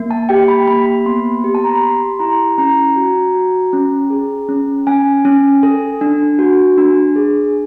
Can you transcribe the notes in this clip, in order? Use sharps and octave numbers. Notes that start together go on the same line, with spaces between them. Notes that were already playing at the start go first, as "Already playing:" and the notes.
Already playing: A#3
A5
G4 G5
B5
A#3 B5
B5
B3 C6
G4
A5
A#5
B5
G4 C6
E4 A#5
C#4 A#5
F#4
F#4
C#4
G#4
C#4
C#4 G#5
C#4
A4
D4
F#4
D4
G#4